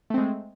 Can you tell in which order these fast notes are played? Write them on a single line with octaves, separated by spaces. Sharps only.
A3 C4 G#3